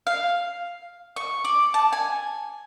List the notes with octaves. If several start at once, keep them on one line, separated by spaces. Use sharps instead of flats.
F5
C#6
D5
A5
G#5